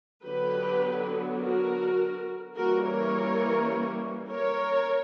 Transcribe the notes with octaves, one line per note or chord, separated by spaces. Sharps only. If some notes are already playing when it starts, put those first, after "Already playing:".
D3 F#3 B3 G4 B4
F#4 A#4
E3 G3 A#3 C#4 F#4 A#4
A#4 C#5
A#4 C#5